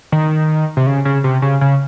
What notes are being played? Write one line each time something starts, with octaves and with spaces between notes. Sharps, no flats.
D#3
C3
C#3
C#3
C3
C#3
C#3